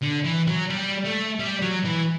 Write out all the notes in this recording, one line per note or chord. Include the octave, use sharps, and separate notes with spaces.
D3
E3
F#3
G3
A3
G3
F#3
E3